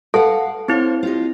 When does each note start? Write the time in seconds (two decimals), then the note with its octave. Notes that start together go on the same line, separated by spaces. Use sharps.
0.14 A4 B4 F5 F#5 A5
0.68 C4 E4 C5 C#5
1.03 F4 G4 D#5